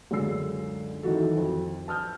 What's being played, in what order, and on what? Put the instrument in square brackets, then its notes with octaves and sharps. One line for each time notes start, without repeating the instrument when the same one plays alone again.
[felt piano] C#2 F#2 D3 G#4 E6 C7
D#3 E3 F#3 F#4 A4
F2
A5 D#6 F6 G6